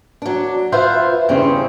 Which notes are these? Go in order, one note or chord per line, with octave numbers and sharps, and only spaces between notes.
F#3 D4
F4 B4 C5 E5 F#5
E2 G2 C#3 C4 C#4 G#4